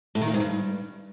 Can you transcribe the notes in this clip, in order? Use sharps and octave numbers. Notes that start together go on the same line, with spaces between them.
A2
D#3
A#2
G#2
G2